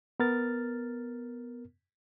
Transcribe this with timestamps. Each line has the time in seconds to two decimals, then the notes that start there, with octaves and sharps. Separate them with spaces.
0.20 B3 A#4 F6 A6